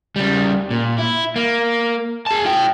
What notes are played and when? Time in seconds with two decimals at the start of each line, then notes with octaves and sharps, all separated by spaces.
0.16 C#3 G3
0.71 A#2
0.98 E4
1.36 A#3
2.26 G#4 A5
2.45 E4 G5